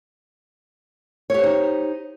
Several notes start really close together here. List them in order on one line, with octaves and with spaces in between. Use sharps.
C#5 G4 C5 D#4